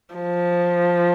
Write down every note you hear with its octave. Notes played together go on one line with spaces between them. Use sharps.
F3